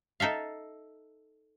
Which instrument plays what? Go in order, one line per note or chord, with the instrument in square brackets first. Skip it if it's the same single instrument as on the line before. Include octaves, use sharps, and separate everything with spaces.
[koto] D#4 A4 E5 F5